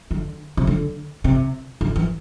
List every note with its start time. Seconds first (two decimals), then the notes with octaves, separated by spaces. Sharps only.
0.11 D3
0.57 C3
0.67 D3
1.24 C3
1.81 D3
1.96 E3